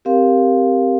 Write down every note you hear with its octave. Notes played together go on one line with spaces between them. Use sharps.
C4 G4 A#4 F5